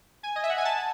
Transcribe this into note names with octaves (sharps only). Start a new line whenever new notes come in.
G#5
D#5
E5
F#5
G#5
A5